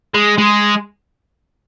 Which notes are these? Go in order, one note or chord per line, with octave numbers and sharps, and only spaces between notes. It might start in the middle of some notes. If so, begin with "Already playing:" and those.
G#3
G#3